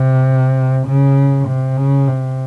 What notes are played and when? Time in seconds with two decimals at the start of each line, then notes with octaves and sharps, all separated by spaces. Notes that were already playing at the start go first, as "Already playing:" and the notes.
Already playing: C3
0.87 C#3
1.48 C3
1.77 C#3
2.07 C3